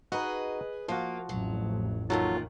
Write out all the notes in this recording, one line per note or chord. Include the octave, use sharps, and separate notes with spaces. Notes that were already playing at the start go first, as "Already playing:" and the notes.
D#4 F#4 G#4 B4 D#5
F3 A#3 F4 F#4
A1 F2 F#3
D#2 A#2 D#3 F#3 F4 A4